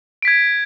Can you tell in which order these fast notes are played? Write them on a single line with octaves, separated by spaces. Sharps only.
D7 B6 G#6